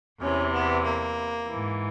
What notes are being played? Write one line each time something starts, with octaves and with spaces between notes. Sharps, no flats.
E2 C3 E3 C#4
B3
A#3
G#2 E3